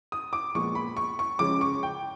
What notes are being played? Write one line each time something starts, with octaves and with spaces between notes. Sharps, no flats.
D#6
D6
A#2 F3 G#3 B3 C#6
B5
C#6
C#6
C#3 F3 G#3 C#4 D6
C#6
G5